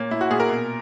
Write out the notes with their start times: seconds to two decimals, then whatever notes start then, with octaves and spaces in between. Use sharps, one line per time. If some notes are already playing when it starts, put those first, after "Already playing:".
Already playing: A#2 A#3 C#4
0.11 A#3 E4
0.21 F#4
0.30 A#2 G#4
0.40 A#4
0.50 B2